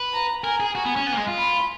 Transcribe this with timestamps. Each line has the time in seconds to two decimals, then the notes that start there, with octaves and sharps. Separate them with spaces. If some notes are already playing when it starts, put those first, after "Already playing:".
Already playing: B4
0.13 A#5
0.44 A#4 G#5
0.60 G#4
0.75 F#4 G#5
0.85 B3
0.96 C#4
1.07 B3
1.13 A#3
1.17 G#3
1.28 F4
1.38 B5